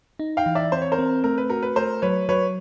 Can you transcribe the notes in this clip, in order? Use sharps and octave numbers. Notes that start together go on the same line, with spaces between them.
D#4
F5 G5
E3
D5 E5
C4 C5
C#5
A#4 C5
C4
A3 A#4
B4
F#4 A#4
B4
A3 A#4 C5
F#3 B4 C#5
F#3 B4 C#5